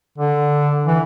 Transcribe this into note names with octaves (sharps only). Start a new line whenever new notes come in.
D3
E3